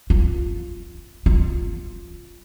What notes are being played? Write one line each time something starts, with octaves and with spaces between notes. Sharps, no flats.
F4
F4